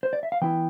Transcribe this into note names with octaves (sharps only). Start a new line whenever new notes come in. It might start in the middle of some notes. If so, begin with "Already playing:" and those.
C5
D5
E5
F5
E3 B3 E4 G5